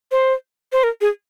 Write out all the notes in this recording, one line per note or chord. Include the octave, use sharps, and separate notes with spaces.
C5
C5
A#4
G#4